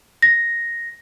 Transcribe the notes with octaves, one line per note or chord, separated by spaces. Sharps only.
A#6